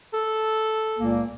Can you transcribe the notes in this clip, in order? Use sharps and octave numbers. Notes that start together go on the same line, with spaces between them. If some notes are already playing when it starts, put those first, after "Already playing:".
A4
C#2 A#2 A#3